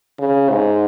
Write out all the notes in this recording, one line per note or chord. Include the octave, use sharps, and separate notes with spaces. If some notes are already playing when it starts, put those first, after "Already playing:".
C#3
G#2